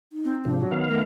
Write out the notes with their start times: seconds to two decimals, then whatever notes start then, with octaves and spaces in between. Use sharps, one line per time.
0.13 D#4
0.25 C4
0.45 G#2 C3 F3 D4
0.59 F#3
0.71 D#3 B3 F5
0.88 A3 A#4